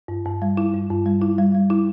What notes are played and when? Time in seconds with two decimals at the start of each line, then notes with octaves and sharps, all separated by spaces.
0.08 G2
0.25 G2
0.42 G3
0.57 E4
0.73 G2
0.90 G2
1.06 G3
1.22 E4
1.38 G3
1.54 G3
1.70 E4